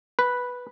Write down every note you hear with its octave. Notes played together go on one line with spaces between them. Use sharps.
B4